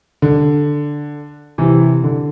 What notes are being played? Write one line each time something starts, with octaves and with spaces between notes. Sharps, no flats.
D3
C3 E3
D3